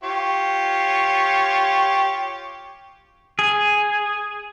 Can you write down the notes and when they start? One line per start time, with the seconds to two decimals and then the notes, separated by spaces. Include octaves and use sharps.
0.03 F4 G4 C#5
3.39 G#4